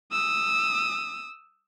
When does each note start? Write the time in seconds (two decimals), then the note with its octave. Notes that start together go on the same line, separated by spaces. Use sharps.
0.12 D#6 E6